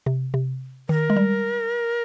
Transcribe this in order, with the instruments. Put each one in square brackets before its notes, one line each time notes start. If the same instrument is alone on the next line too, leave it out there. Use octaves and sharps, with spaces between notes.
[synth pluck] C3
C3
[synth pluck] D#3 [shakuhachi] A#4
[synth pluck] G#3
G3